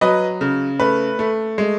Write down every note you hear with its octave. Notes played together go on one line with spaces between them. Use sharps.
F#3 B4 D#5
C#3
A3 B4
A3
G#3